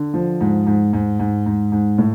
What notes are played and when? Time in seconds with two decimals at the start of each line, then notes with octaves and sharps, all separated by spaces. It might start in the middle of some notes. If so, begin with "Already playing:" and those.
Already playing: D3
0.14 F3
0.41 G#2
0.67 G#2
0.93 G#2
1.19 G#2
1.46 G#2
1.72 G#2
1.98 A2